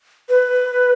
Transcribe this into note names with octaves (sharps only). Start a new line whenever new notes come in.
B4